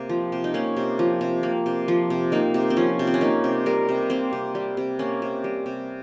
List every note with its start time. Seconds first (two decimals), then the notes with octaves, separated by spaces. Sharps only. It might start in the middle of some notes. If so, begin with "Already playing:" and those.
Already playing: C3 A#3
0.09 F3
0.32 C3
0.44 D#4
0.54 A#3 C#4
0.77 C3
0.99 F3
1.21 C3
1.43 A#3
1.66 C3
1.88 F3
2.10 C3
2.32 A#3 D#4
2.54 C3
2.70 C4
2.77 F3 C#4
2.99 C3
3.07 C4
3.14 C#4
3.21 A#3 D#4
3.44 C3
3.66 G3 A#4
3.89 C3
4.10 A#3 C4
4.33 C3
4.55 G3
4.77 C3
4.99 A#3 C#4
5.22 C3
5.44 G3
5.66 C3